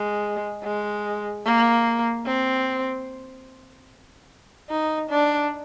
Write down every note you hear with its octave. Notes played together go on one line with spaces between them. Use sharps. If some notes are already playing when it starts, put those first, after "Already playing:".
Already playing: G#3
G#3
A#3
C4
D#4
D4